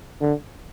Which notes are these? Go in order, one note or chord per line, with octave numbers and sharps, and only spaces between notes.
D3